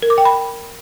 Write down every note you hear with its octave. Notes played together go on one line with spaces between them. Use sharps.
A#4
D6
G5
B5